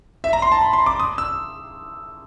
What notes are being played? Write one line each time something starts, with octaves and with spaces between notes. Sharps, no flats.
E5
A#5
C6
A5
B5
C6
D6
D#6
E6